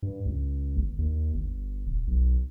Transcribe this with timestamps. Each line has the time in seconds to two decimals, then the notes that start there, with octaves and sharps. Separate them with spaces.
0.02 G2
0.26 C#2
0.76 G1
0.98 D#2
1.34 G1
1.87 D#1
2.07 B1